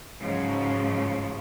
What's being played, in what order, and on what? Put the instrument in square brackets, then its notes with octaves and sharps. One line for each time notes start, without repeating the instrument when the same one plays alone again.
[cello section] G#2 C#3 F3 F#3